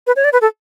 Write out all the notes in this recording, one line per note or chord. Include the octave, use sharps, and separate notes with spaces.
B4
C#5
D5
B4
A4